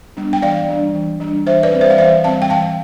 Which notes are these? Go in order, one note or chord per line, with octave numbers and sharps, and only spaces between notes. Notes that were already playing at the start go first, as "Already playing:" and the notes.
G3 B3 D4
G5
E3 D5 F5
G3 D4
E3
G3 D4
E3 C5 E5
B4 D5
G3 C4
C5 E5
F5
E3 C5 E5
G3 C4 F5 A5
G5
E3 F5 A5